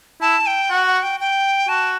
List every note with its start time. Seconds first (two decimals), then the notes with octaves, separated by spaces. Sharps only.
0.21 E4 A5
0.47 G5
0.70 F#4 F#5
0.87 F#5
1.03 G5
1.20 G5
1.69 F#4 A5